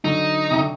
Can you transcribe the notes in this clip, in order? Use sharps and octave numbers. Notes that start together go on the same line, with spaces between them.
D3 F#3 D#4
C3
D3